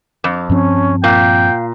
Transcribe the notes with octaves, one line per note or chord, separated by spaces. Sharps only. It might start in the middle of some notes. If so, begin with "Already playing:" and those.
F2
G2 F3 C4 C#4
A#2 F5 G5